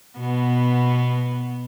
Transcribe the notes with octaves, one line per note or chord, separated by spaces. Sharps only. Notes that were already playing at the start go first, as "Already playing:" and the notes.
B2 B3